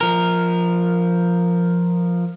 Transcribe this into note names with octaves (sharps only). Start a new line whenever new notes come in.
F3 A#4